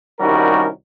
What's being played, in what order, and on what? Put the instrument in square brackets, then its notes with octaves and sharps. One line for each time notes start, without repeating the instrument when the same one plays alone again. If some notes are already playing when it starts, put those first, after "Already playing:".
[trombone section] C2 D#3 G3 C#4 F#4 A#4